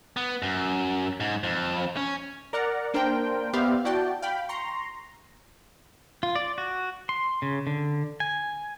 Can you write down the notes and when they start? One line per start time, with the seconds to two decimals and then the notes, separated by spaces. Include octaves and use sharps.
0.17 B3
0.42 F#2
1.20 G#2
1.43 F2
1.97 C#4
2.53 A#4 D5 F#5 A#5
2.94 A#3 D4 A#4 C5 G5
3.53 B3 G4 C5 D5 E5 F5
3.85 E4 F#4 D5 G5 A5
4.22 F5 G5 B5
4.49 A#5 C6 C#6
6.23 F4
6.35 D5
6.58 F#4
7.09 C6
7.42 C#3
7.67 D3
8.20 G#5